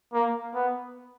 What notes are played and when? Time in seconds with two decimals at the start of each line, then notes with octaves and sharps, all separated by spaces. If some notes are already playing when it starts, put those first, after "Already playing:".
0.13 A#3
0.54 B3